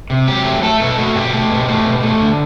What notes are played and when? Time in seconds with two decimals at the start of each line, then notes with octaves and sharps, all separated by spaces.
0.10 C3
0.28 F#3 G4
0.45 A3
0.62 A3 A4
0.80 B2 A4
0.98 A3 F#4
1.15 B2 G4
1.33 A3
1.50 B2
1.68 A3
1.85 B2
2.03 A3
2.20 D3